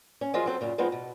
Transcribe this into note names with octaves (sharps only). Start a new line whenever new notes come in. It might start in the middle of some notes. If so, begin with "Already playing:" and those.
C#4
F3 F#3 F4 G#4 A#4 D#5
F#3 C4 A4
F#2 A#2 C#3
F3 G#3 B3 C4 D#4
B2